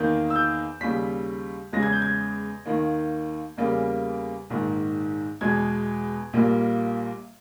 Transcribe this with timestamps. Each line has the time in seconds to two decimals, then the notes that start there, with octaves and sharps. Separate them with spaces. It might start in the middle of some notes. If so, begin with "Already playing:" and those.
Already playing: E2 D#3 A#3 G6
0.30 E6
0.36 G6
0.81 D#2 C#3 G3 B6
1.73 E2 C#3 G#3 A#6
1.83 G#6
1.93 G6
2.02 G#6
2.66 D#2 D#3 A#3
3.57 E2 C#3 G3 A#3
4.50 A#1 G#2 D#3
5.41 E2 B2 G#3 G#6
6.33 A#1 A#2 G3 A#3